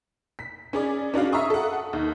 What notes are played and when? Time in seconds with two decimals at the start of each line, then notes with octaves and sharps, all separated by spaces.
0.39 B6
0.73 C#4 G#4 D5
1.14 C#4 D4 F#4 F5
1.32 E5 F5 A#5 C#6 D#6
1.50 A4 F#5
1.93 D#2